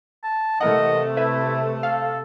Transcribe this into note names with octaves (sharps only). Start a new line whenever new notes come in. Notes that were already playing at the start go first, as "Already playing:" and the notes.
A5
C3 E3 A3 A#4 D#5 F#5
E4 B4 E5
A4 F5